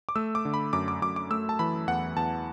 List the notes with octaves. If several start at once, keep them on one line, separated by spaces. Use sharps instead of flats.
D6
A3 E6
D6
D3
B5
F#2 D6
D6
F#2 D6
D6
A3 E6
A5
E3 B5
E2 F#5
E2 A5